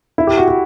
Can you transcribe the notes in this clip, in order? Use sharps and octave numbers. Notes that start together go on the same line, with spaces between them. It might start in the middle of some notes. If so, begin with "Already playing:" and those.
E4
G4
F#4
F#4